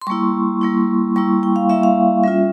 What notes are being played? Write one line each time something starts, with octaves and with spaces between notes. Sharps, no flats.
C6
G3 A#3 E4 C#6
G3 A#3 E4
G3 A#3 E4 C#6
G5
F5
G3 A#3 E4 E5
F5
G3 C#4 F4 E5